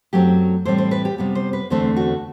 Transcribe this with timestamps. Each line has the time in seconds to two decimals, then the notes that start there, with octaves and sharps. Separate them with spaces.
0.13 F#2 F#3 A3 C4 G4
0.65 A2 E3 G3 C4 C5
0.78 C5
0.91 B4
1.05 G4
1.18 C3 G3 B3
1.35 C5
1.53 B4
1.70 E2 D3 A3 C4 C5
1.96 F#4